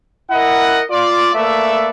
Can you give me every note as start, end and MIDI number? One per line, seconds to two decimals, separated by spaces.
0.31 0.82 64
0.31 0.82 70
0.31 0.82 75
0.31 0.82 78
0.90 1.30 65
0.90 1.30 74
1.35 1.90 57
1.35 1.90 58
1.35 1.90 69
1.35 1.90 71
1.35 1.90 74
1.35 1.90 76